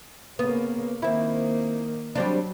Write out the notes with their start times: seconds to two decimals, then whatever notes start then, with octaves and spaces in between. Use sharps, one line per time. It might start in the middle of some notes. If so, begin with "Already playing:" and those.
0.39 C#3 A#3 B3
1.02 D#3 A#3 C4 E4
2.15 F#3 G3 C4 D4